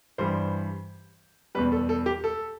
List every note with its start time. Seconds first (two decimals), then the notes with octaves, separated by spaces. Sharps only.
0.18 G2 E3 G3 C5
1.55 E2 B2 G3 B4
1.72 A4
1.89 A4
2.06 G4
2.24 A4